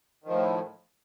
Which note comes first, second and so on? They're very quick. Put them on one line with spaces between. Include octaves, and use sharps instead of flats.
D#3 F3 A2